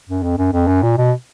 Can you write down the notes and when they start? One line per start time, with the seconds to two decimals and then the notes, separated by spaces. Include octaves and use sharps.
0.10 F#2
0.23 F2
0.38 F#2
0.53 F2
0.68 F#2
0.83 A#2
0.97 B2